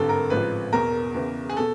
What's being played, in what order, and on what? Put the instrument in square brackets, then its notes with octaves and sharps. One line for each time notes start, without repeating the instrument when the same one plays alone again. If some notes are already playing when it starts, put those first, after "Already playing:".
Already playing: [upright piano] G#1 G2 D3 A4
A#4
A1 G#2 F3 B4
E1 E2 B2 A#4
E2 C#3 E3
G#4
B2 A4